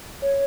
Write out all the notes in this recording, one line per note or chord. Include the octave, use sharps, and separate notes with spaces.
C#5